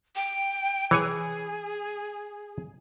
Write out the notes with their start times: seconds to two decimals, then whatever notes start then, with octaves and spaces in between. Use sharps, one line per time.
0.16 G5
0.91 E3 G#4 C#5 G#5